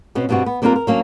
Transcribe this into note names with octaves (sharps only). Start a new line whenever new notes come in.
B2 C4 C#4
G2 B2 G3 C4 F#4
B3
G3 A#3 C4 D4 F4 A#4
A#4
F#3 A#3 C#4 D4